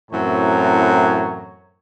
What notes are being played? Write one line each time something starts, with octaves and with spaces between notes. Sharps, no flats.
F#2 A2 E3 C4 C#5 A#5